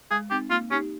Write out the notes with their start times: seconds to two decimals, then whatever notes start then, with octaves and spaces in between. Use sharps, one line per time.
0.11 G#3 G#4
0.31 C4 D#4 G4
0.50 A#3 F4
0.71 C#4 D#4 G4